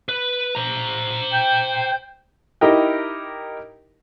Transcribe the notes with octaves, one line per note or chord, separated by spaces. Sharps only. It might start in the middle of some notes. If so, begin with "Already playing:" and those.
B4
C5 A#5
G5 G6
D#4 E4 G4 A#4 D#5 G5